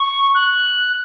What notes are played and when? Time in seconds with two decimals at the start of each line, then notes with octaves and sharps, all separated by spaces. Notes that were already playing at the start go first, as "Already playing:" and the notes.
Already playing: C#6
0.34 F#6